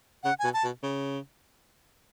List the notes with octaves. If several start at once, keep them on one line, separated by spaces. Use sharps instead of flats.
C#3 F#5
B2 G#5
A5
B2
C#3